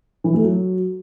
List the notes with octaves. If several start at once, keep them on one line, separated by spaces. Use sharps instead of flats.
E3
A3
F#3